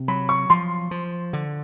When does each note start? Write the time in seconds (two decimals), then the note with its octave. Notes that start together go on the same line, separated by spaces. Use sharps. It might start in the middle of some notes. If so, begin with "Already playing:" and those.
Already playing: C3
0.08 F#3 B5
0.29 C#6
0.50 F3 C6
0.91 F3
1.33 D3